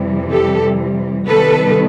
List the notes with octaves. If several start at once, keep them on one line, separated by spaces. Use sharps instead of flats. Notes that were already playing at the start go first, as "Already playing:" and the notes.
Already playing: F2 C3 E3 G3
G4 A4
C3 D#3 G3 B3 A4 B4